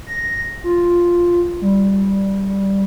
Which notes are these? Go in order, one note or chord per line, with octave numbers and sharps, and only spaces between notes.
A#6
F4
G3